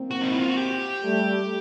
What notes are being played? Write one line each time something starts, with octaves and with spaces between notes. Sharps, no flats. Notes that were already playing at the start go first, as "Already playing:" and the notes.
Already playing: A#3 C4
F#4
D#4
E4
F4
F#4
G4
G3 A3